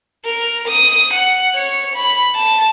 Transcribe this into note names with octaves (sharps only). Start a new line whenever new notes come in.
A#4
D#6
F#5
C#5
B5
A5